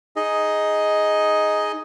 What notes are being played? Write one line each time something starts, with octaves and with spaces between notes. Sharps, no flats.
D#4 G#4 D#5